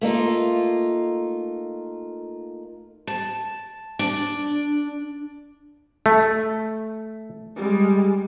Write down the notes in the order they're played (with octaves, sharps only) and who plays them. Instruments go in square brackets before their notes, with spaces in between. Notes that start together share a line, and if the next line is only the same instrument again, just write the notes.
[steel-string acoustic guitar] A3 A#3 D#4 F4
A5
D4
[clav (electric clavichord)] A3
[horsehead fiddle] G3 G#3